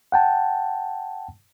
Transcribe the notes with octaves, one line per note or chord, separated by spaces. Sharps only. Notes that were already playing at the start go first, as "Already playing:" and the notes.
F#5 G5 A5